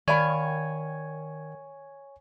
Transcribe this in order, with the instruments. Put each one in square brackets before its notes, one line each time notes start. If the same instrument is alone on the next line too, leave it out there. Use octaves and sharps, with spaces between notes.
[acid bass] D#3 [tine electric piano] C#5 G#5 [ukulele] D5 F5 B5